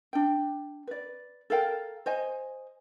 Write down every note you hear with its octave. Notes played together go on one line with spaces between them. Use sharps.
D4 G5
B4 D5
A4 A#4 F5 G5
C5 D#5 G#5